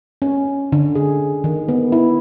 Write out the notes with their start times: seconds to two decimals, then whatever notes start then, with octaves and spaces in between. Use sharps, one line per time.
0.22 C#4
0.72 D3
0.95 G#4
1.44 D#3
1.69 B3
1.92 E4